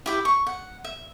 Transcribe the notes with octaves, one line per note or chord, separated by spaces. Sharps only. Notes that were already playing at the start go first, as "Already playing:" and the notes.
E4 G4 B4
C#6
F#5
E5